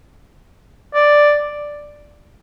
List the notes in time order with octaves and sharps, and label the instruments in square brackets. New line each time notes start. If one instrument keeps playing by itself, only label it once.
[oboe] D5